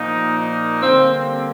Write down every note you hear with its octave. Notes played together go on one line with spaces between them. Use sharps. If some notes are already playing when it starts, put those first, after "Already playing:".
Already playing: A#2 F3 A#3 D#4
D#4
D3 G3 A#3 C4
C4